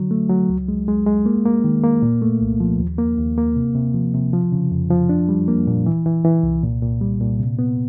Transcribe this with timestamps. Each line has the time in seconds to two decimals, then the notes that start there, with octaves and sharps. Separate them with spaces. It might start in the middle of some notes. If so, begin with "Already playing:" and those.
Already playing: D3 F#3
0.11 A3
0.30 F#3
0.49 C#2
0.68 G#3
0.88 G#3
1.07 G#3
1.26 A#3
1.45 A#3
1.64 D#3
1.83 A#3
2.02 A#2
2.22 A3
2.41 C2
2.60 F3
2.79 D#2
2.98 A#3
3.18 D#2
3.37 A#3
3.56 C3
3.75 C3
3.94 F3
4.14 C3
4.33 F3
4.52 C#3
4.71 F2
4.90 F3
5.09 D4
5.29 G3
5.48 A#3
5.67 A#2
5.86 E3
6.06 E3
6.25 E3
6.43 C2
6.63 A#2
6.82 A#2
7.01 G3
7.21 A#2
7.40 C3
7.59 B3